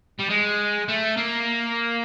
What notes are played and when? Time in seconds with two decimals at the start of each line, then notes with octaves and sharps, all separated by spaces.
0.19 G3
0.29 G#3
0.88 A3
1.17 A#3